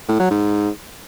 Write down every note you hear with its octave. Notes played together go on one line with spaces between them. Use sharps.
A2
F#3
G#2